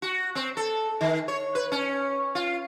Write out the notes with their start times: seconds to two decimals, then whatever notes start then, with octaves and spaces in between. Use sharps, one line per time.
0.02 F#4
0.35 C4
0.57 A4
1.01 D#3
1.28 C#5
1.55 B4
1.72 C#4
2.35 F4